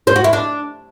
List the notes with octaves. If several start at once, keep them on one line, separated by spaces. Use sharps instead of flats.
C5
F#4
E4
D4